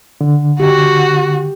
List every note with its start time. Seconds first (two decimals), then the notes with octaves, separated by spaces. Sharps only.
0.21 D3
0.60 F#4 G4